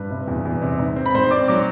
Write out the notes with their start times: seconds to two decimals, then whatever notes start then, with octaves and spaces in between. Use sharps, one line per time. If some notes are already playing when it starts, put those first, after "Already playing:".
Already playing: G2 B4
0.10 C3
0.28 E2
0.45 E2
0.62 C3
0.79 G#2
0.96 C4
1.06 B5
1.14 G#2 C5 C6
1.31 C4 D5 D6
1.48 F#3 D5 D6